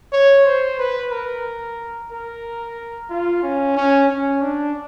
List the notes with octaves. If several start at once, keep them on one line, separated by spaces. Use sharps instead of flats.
C#5
C5
B4
A#4
A#4
F4
C#4
C#4
C#4
D4